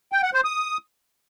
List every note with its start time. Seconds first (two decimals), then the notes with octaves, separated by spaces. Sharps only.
0.12 G5
0.23 F#5
0.34 C5
0.44 D#6